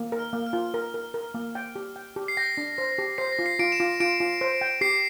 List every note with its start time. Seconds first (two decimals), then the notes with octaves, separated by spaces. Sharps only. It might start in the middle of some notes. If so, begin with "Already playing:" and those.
Already playing: A#3
0.12 A#4
0.19 F6
0.33 A#3
0.47 F6
0.53 F4
0.74 A#4
0.94 A#4
1.14 A#4
1.34 A#3
1.55 G5
1.76 G4
1.96 G5
2.16 G4
2.28 C7
2.37 G5 A#6
2.57 D4
2.78 C5
2.98 G4
3.18 C5 C7
3.32 A#6
3.39 F4
3.46 C7
3.59 F4 D7
3.72 E7
3.80 F4
4.00 F4 D7
4.20 F4
4.41 C5
4.61 G5
4.81 G4 C7